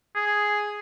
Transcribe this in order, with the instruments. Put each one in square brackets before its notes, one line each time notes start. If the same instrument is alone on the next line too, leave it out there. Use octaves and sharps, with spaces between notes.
[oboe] G#4